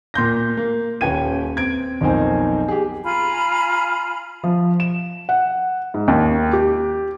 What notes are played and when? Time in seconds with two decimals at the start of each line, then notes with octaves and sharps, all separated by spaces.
0.14 A#2 C6 G6 A#6
0.57 A#3
1.01 D#1 C#4 B4 G5 G#6 D#7
1.56 C4 G#6 D7
2.01 B1 F2 D#3 D#4 C5 G#5
2.68 G4 G#4
3.04 F4 G#5 A#5 B5
4.44 F3
4.80 E7
5.29 F#5
5.94 G#2
6.08 D#2
6.53 G4